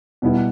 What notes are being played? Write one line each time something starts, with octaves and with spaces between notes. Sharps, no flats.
B2 G3 B3 E4